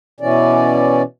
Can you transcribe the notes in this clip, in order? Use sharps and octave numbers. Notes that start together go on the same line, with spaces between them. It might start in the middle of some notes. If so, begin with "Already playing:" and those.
B2 E3 C#4 D5